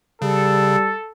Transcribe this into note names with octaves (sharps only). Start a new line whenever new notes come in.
C#3 G3 A4